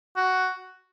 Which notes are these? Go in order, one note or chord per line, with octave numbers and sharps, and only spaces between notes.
F#4